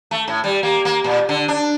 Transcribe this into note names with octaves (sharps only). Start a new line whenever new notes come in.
A3
A2
G3
A#3
A#3
A#2
D3
D4